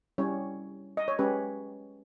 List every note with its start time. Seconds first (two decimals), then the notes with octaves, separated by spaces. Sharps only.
0.18 G3 C#4 E4 C#5
0.97 D#5
1.08 C#5
1.19 G#3 C#4 G4 B4